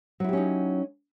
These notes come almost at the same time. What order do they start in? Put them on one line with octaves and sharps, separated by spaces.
F#3 E4 G4 C#4 D#4